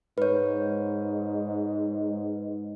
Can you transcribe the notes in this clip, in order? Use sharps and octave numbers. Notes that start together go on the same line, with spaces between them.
G#2 B4 C#5